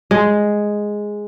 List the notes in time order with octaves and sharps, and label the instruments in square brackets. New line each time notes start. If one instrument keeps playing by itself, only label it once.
[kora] G#3